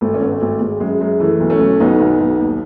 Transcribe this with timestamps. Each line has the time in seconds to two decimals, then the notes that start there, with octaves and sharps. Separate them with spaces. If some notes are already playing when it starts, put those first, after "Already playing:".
0.01 G#1 A3
0.14 C#4
0.21 G#1 B3
0.32 A3
0.42 G#1
0.60 G#1 G#3
0.80 F#2 G#3
1.01 F#2 G#3
1.20 E3 A3
1.40 B1
1.50 A3 C#4
1.61 B1
1.80 B1 B3 D#4
2.01 B1
2.20 B1
2.40 D#2